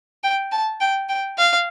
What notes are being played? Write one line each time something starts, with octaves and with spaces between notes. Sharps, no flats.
G5
A5
G5
G5
F5